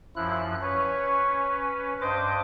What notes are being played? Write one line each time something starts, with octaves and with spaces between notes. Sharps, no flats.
F#2 F3 E4 F#6
C#4 B4 C#5
G2 C5 D#5 D6